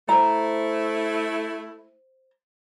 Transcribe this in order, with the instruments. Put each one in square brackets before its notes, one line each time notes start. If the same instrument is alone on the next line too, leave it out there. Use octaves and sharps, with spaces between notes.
[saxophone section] A3 E4 [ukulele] C5 A#5